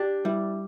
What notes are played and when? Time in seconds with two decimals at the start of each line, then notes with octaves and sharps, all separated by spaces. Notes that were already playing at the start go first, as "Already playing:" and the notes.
Already playing: D4 G4
0.25 G3 E4